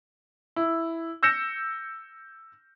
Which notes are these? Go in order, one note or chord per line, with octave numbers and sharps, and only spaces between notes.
E4
E6 G6 A#6 C#7 E7